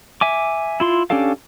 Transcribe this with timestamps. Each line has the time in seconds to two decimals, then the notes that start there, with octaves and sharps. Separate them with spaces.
0.21 E5 G#5 D6
0.80 E4 F4 C6
1.10 C#4 D4 G4 A4 F5